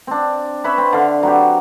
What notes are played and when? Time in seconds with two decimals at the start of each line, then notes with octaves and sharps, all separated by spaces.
0.07 C4 D4
0.64 B4 C#5 E5 B5
0.78 C4
0.93 D3 B4 F5
1.23 F#3 C4 G4